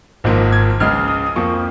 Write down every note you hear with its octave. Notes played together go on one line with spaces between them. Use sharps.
G#1 G#2 F3 A#3
G#6
C#2 C#3 G#3 F6
D#6
D#6
F2 F3 A#3 C#6